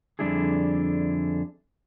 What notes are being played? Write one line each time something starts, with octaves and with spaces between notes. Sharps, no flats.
F2 D3 G3 D4 E4 G#4